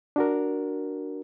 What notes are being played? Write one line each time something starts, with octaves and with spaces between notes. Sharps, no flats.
D4 F#4 A#4